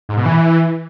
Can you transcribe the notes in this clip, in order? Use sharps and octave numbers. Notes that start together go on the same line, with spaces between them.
G#2
B2
E3